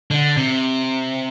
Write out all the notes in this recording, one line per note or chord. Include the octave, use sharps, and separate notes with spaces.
D3
C3